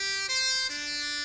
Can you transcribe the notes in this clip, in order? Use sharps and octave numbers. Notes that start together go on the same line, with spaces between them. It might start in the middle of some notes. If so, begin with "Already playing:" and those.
Already playing: G4
C5
D4